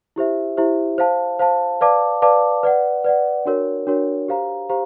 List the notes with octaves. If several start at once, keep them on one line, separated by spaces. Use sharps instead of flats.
E4 G4 C5 E5
E4 G4 C5 E5
C5 F5 A5
C5 F5 A5
B4 D5 F5 A5 D6
B4 D5 F5 A5 D6
B4 D5 F#5
B4 D5 F#5
D4 F#4 A#4 C#5
D4 F#4 A#4 C#5
G4 C5 F5 A#5
G4 C5 F5 A#5